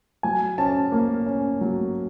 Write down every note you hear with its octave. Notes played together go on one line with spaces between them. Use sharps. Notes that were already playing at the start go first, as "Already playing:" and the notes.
F#3 G#5
C#4 A5
A#3
C#4
F#3